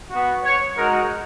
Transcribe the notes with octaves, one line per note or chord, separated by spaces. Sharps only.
B3 F#4
C#5
G#3 D#4 F#4 A#4